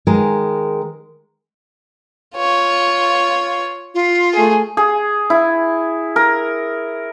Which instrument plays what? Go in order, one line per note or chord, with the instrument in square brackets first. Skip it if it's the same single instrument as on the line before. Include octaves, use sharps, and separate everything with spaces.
[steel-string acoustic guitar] D#3 G#3 A#4
[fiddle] F4 C#5
[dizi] F4
[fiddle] A3 G#4
[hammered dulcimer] G#4
E4
A#4